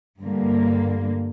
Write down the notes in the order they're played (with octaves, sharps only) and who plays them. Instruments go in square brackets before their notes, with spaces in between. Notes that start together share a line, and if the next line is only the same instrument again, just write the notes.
[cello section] G2 D3 G3 A#3